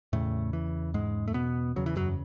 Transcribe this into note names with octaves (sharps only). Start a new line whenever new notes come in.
E2 A2 C#3 A3
E3
G#2 G#3
A3
B2 B3
E2 C#3 F#3
E3
F#2 F#3